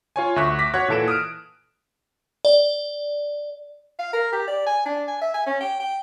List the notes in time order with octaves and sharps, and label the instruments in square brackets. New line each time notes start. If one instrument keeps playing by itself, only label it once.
[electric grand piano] F4 C#5 G#5
D2 E5 C#6 F#6
D6 A#6 B6
F#4 C#5 F#5 F#6 G#6
A#2 E3 A4 D7 E7
D#6 F6 D7
[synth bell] D5
[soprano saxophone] F5
A#4
G4
D5
G#5
D4
G#5
E5
G#5
C#4
G5
G5